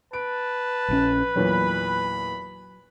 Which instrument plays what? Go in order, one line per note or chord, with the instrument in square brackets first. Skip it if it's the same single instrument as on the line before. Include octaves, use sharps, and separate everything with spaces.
[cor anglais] B4 [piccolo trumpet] A5 [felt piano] D7
[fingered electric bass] A#1 D#3 C#4
[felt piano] E2 A#2 C#5 [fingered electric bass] F#3 [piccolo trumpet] B5